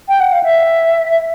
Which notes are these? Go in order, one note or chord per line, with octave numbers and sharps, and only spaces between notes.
G5
F#5
F5
E5